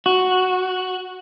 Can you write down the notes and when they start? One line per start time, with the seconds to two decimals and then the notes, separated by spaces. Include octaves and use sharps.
0.06 F#4